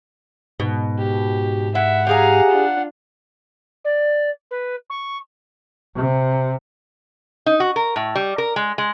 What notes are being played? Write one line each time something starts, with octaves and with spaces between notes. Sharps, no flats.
G#2 B2
G4
E4 E5 F#5
G4 G#4 F5 G#5 A#5
D4 F4
D5
B4
C#6
C3
D#4
F#4
A#4
A2
G3
A#4
G#3
G#3